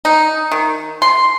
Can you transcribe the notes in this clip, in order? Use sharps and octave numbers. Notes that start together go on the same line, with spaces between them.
D#4
D#3
C6